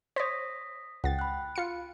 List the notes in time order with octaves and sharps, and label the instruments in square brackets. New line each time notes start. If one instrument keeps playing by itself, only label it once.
[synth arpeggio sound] C5 C#5 [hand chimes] D#6 A#6 B6
[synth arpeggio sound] C#2 A6 [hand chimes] F#5 G5
[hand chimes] B5 F#6
[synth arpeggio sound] F4 C#7